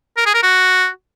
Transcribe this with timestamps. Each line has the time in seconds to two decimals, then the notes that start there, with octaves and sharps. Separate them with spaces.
0.17 A#4
0.26 G#4
0.34 A#4
0.43 F#4